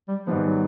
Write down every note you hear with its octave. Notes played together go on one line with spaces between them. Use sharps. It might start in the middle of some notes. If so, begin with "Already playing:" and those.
G3
G#2 D#3 F3 G3 B3
F#3